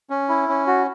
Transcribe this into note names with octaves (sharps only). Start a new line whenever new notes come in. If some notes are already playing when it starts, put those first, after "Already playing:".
C#4
E4
C#4
F#4